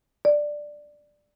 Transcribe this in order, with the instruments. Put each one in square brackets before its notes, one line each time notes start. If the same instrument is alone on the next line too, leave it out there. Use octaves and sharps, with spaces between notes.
[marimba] D5